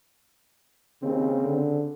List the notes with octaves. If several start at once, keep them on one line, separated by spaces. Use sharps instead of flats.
D#2 C#3 C4
D3